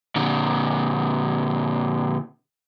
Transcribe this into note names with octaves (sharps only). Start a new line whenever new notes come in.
A#2 D3